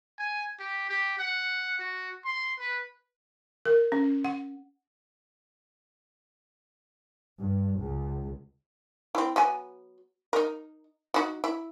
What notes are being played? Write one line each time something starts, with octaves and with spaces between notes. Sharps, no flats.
G#5
G4
G4
F#5
F#4
C6
B4
A#4
C#4
F#5
G2
C#2
C4 E4
F#3 B3 G#5
D#4 A#4
D#4 F#4
E4